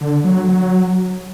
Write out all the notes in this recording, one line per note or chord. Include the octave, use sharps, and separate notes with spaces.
D3
F#3
F#3